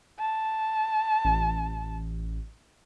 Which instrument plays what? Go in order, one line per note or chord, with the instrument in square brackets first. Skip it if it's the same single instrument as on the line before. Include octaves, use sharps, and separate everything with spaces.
[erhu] A5
[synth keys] A1